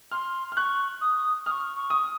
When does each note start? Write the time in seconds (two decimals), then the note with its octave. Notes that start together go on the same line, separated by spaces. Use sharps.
0.11 C6 F6
0.52 F6
0.56 C#6 F#6
1.01 D#6
1.46 C#6 D#6 F6
1.76 C#6
1.90 D#6